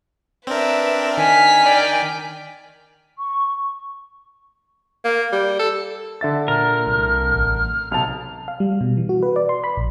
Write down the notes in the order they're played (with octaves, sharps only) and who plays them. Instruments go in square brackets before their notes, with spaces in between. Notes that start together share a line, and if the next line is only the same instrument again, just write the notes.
[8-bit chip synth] C4 A#4 [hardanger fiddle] D4 [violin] B4 E5
[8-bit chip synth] D#3 [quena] G#5 [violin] F6 B6
[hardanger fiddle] D5 G5
[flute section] C#6
[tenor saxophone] A#3
G3
A4
[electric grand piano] D3 E5 A6
[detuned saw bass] A#2 [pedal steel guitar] A#4 [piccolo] F6
[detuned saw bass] C2
A1
[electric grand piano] B1 A5 [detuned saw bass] C3 [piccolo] F7
[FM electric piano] F5
G3
B2
E3
F#4
B4
D5
C6
B5
A#1